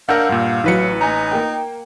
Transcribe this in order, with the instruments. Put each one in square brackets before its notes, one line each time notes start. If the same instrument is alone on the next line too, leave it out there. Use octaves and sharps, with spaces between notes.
[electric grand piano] D4 A#4 [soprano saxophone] F5 [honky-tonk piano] F#5 E6 G6
[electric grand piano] G2 A#2
[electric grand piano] A1 B4 C#7 [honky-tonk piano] E3 F#3
[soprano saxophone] D#4 [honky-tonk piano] G#5 A#5
[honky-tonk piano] A#3 G5